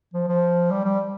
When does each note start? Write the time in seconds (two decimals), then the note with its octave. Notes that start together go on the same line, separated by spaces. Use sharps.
0.14 F3
0.28 F3
0.70 G3
0.84 G3